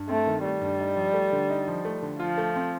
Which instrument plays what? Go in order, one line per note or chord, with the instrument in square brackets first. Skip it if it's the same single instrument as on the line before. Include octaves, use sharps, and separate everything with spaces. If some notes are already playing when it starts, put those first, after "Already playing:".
Already playing: [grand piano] G2
[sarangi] A3 [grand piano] C4
[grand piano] D#3
[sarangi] G3 [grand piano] A3
[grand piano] G2
D#4
F3
A3
D3
D#4
F3
A3
D3
[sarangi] F3 [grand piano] F4
[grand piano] A3
C4